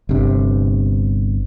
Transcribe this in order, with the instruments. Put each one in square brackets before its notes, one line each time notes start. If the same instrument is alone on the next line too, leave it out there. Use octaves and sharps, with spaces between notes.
[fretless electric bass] G1 C3